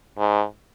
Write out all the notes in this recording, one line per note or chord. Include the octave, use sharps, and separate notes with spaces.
G#2